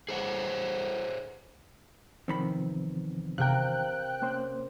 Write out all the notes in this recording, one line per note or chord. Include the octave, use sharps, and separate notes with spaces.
G#4 C5 C#5 F#5
E2 C3 D#3 F3 C4 B5
C3 A#4 F5 G5 F#6
A#3 C#4 C5